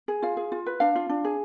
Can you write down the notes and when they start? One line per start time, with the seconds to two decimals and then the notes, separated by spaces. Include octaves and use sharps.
0.08 G#4
0.22 F4 F5
0.37 G#4
0.52 F4
0.66 B4
0.80 D4 F5
0.95 F4
1.09 D4
1.24 G#4